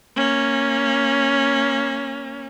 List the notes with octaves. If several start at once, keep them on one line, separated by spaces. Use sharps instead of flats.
A#3 C#4